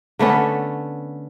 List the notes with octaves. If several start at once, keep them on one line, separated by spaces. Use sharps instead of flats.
D3 A3 B3 C#4